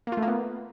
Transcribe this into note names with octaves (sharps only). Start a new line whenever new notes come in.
A#3
F4
A3
A#3
B3